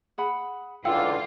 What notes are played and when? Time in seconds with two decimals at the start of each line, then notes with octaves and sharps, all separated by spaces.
0.18 G#4 F#5 B5
0.85 C#2 D3 E3 F4 F5 G5 E6